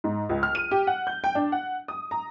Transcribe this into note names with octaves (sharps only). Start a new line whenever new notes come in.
G#2
C#2
F6
D#7
G4
F#5
G6
G5
D4
F#5
D#6
A#5